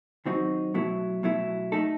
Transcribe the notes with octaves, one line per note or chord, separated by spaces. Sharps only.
D#3 F#3 C4 D#4 F#4
B2 F#3 A3 E4
B2 F#3 A3 E4
A3 D#4 A4